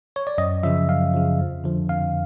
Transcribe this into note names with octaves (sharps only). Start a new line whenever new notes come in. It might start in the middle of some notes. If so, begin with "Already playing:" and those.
C#5
D5
F#2 D#5
C#3 F3 E5
F#2 F5
C#3 F3
F2
D3 F3
F2 F5